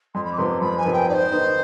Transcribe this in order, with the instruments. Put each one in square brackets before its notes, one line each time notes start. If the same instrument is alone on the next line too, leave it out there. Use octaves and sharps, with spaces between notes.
[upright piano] F2 [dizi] C6
[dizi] B5
D6
[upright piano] C3 F3 B3 [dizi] C6
[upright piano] F2 [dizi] B5
[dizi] G#5
[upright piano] C3 F3 B3
[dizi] G5
[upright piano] G#2 [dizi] D5
[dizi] C5
[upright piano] D#3 B3 D#4